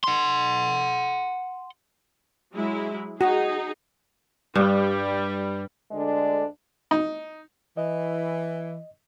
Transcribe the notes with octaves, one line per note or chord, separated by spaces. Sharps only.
F#5 C6
F#3 G#3 E4
D#4 F#4 G#4
G2 G3
D2 D3 G#3 D4 D5
D#4
E3 D#5